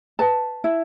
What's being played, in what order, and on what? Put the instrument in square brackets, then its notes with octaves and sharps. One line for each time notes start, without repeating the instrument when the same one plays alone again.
[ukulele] B4 A5
E4